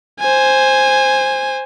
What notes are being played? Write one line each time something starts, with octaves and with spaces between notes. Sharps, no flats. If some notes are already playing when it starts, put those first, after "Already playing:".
C5 G#5